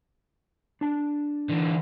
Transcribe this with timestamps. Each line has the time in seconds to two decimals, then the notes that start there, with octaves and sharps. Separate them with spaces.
0.81 D4 A5
1.49 D3 E3